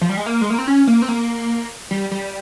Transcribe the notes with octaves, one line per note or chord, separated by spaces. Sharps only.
F3
G3
G#3
A#3
G#3
A#3
C4
C#4
A#3
C4
A#3
G3
G3